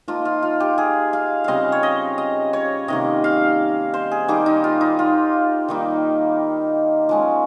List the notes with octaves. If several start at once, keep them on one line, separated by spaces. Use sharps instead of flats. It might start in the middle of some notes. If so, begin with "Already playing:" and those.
F3 A#3 D#4 F4
F4
F4
G4
G#4
F5
C#3 G3 C4 D#5 F5
C#5
D#5
D#5
C#5
C3 D#3 A#3 D#5
F5
C5
G#4
D#3 G3 A#3 D#4 G4
D#4
F4
D#4
F4
D#3 G3 A#3 D#4
F3 G#3 C#4